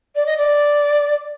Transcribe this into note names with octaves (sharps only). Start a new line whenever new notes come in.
D5
D#5
D5